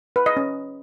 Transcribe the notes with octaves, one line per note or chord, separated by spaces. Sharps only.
B4
D#5
C#4